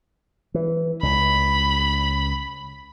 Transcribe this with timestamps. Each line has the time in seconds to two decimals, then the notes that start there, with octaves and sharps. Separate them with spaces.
0.54 E3
1.03 C#2 B5